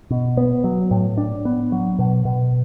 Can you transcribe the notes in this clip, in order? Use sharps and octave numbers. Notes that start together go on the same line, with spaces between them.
B2
B3
F#3
A2
D4
B3
F#3
B2
B2